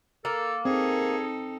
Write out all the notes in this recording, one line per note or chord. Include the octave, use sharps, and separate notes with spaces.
A#3 A4
C4 D#4 G#4 A4